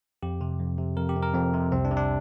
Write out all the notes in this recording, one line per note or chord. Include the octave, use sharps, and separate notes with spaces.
F2 G4
C3
F2
C3
F2 A#4
G4
C3
A#4
F2 C4
C3
C2 C4
D4
C3
D4